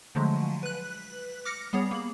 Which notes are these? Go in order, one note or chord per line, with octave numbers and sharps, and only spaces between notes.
D3 F3 F#3 G#3 A3
B4 F#6
D6 F6 A#6 C#7
G3 B3 G#4 C#5
A#3 F#7